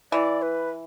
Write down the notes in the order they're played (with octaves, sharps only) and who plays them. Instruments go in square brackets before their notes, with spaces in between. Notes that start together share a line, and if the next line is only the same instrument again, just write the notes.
[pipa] E3 [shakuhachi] D5
[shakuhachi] B4